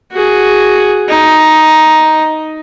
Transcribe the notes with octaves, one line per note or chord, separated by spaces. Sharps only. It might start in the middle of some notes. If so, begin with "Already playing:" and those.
F#4 G#4
D#4